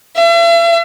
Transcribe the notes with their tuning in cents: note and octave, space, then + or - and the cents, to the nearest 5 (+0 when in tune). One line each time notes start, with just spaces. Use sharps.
E5 +45